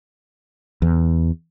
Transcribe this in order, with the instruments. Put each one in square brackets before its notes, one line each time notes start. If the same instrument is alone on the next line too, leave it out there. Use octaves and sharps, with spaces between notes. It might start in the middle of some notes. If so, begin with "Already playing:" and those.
[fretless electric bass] E2